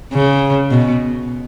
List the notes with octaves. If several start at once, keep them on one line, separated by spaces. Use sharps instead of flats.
C#3
B2